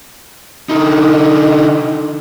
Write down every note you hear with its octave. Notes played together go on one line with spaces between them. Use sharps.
D3 D#4